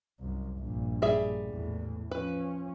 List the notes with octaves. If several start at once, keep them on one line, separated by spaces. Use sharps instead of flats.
C2 F#2
A#1 G2
G3 G#4 E5
E2 A2
F3 C#4 B4